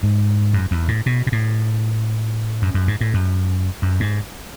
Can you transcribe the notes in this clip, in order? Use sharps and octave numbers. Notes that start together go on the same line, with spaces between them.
G#2
F#2
E2
A2
B2
B2
A2
F#2
F#2
G#2
A2
F#2
F#2
G#2